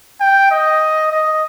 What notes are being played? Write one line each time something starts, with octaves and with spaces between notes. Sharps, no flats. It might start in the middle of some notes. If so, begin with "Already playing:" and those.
G5
D#5
D#5